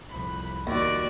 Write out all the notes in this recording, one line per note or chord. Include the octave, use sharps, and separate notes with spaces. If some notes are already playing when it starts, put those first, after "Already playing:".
C2 F2 B5
D#2 F#4 D5